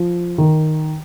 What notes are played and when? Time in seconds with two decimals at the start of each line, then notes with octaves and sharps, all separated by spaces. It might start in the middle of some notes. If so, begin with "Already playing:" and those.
Already playing: F3
0.38 D#3